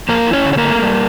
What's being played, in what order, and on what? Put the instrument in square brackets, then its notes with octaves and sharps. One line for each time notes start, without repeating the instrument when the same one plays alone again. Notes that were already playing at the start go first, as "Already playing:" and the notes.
[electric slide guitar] F3 A#3 A#4
E4
C#4 C#5
D3
C#5
A#3 A#4
A3
G3